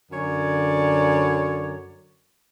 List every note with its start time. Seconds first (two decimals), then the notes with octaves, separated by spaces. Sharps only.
0.12 F#2 D3 C#5 D5